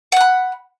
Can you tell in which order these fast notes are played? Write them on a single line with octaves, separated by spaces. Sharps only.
F#5 F#6 B5